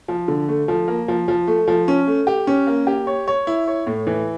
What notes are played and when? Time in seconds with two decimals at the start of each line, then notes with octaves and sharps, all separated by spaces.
0.08 F3
0.28 D3
0.48 A3
0.68 F3
0.88 A#3
1.08 F3
1.28 F3
1.47 A3
1.68 F3
1.88 C#4
2.07 A3
2.27 G4
2.47 C#4
2.67 A#3
2.87 G4
3.07 C#5
3.28 C#5
3.47 E4
3.67 C#5
3.87 A2
4.07 E3